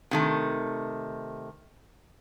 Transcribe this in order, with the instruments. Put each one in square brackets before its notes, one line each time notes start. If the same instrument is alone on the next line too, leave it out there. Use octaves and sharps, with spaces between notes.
[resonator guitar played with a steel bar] C3 D#3 A3